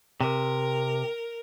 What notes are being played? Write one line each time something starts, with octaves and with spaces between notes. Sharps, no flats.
C3 A#4